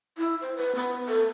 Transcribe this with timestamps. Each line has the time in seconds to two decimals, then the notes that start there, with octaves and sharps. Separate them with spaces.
0.18 E4
0.41 C5
0.56 B4
0.75 B3
1.08 A4